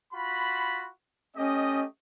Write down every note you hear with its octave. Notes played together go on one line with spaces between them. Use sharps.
F4 F#4 B5
A3 C#4 G4 D#5